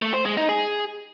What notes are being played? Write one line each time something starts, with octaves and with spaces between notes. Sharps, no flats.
A3
C5
G#3
D#4
G#4